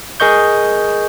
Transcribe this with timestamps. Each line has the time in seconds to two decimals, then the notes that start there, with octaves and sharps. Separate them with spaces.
0.20 G#4 A#4 D#5 C#6 G6